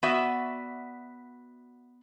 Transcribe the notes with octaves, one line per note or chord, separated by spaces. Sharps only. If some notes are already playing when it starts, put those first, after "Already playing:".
B3 F#4 D5 E5